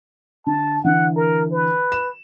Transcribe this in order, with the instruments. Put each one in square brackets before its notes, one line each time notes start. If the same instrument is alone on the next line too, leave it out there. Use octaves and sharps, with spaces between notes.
[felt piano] D3 [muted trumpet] A5
[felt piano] D3 E3 [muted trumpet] F#5
[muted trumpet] A#4
B4
[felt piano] E7